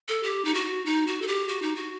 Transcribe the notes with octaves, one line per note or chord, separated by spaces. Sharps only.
A4
G4
D#4
F#4
D#4
F#4
A4
G4
F#4
D#4
F#4